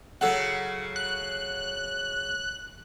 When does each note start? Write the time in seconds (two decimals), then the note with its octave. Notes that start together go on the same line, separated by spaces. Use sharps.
0.21 C#3 F#3 A4 F#5
0.96 F#6